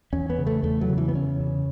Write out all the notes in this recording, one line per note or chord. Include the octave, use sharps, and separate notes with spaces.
E2 C#4
B3
C#3
A3
E2 A3
F#3
C#3
E3
B3
E2 C#4
C#3